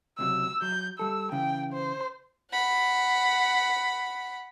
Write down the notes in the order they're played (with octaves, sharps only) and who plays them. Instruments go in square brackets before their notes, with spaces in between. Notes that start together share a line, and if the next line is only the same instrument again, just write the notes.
[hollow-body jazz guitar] C#2 C3 F#3 [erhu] E6
[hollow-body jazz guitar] F#3 [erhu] G6
[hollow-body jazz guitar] G3 A4 [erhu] E6
[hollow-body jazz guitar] C#3 E3 [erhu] G5
[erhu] C5
[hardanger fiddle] F#5 B5